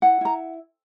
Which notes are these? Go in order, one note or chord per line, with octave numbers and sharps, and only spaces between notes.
E4 F#5
E4 A#5